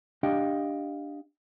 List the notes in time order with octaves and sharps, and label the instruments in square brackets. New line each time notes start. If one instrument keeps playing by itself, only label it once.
[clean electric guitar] D4 G4 D#5 F5 G5